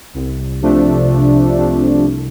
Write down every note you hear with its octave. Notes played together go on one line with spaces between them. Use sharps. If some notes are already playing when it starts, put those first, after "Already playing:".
C2
C3 F3 A3 D4
C2
C3 F3 A3 D4
C2